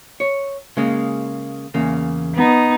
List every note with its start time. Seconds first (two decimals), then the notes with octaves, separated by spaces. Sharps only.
0.20 C#5
0.77 C#3 G#3 A#3
1.74 E2 C#3 A#3
2.34 B3 D#4